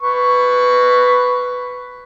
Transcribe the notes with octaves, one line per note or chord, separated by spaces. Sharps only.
B4 C#6